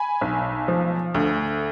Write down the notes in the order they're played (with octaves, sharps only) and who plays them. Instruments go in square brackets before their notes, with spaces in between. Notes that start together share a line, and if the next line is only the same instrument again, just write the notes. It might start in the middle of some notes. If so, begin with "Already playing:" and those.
Already playing: [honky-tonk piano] G#5 B5
B1
F3
D2